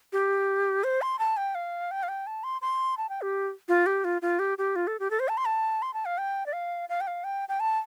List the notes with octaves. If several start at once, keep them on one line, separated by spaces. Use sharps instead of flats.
G4
C5
C6
A5
G5
F5
G5
F5
G5
A5
C6
C6
A5
G5
G4
F4
G4
F4
F4
G4
G4
F4
A4
G4
A4
C5
A5
C6
A5
C6
A5
F5
G5
D5
F5
F5
G5
F5
G5
G5
A5